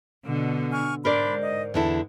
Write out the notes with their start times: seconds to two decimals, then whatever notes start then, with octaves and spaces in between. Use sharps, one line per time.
0.25 B2 D3
0.72 G#5 C#6 F6
1.05 G#2 D4 A#4 C5 D5 B5 C6
1.42 D#5
1.74 E2 D3 E4 A5